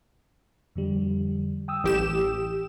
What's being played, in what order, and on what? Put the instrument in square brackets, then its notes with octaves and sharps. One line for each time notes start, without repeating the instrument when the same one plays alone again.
[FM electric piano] F2 D3 G3
G5 D#6 E6
[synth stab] A1 G4 E7